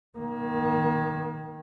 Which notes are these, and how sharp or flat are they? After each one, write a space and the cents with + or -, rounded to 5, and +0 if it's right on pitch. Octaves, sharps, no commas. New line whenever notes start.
D#3 +0 A#3 +35